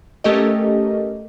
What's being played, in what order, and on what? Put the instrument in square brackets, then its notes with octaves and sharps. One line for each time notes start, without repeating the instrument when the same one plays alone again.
[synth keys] A3 C#4 G4 A4 A#4 D#5